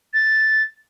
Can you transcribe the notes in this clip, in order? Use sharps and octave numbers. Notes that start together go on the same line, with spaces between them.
A6